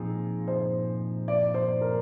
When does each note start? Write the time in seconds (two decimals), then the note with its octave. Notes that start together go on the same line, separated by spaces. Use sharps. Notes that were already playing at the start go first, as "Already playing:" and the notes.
Already playing: A#2 F3 C4 D#4 G#4
0.48 C5
1.28 D5
1.54 C5
1.81 A#4